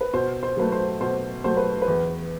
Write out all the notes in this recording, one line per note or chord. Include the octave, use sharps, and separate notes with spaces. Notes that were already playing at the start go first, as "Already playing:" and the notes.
B4
B2 C5
C5
F#3 A3 B4
C5
B2 C5
F#3 A3 C5
B4
B4
E2